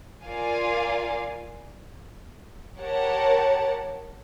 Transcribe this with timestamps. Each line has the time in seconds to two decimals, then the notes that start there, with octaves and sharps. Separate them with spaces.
0.24 F4 A#4 D5 F5 G#5
2.78 G4 A#4 C#5 F#5 A5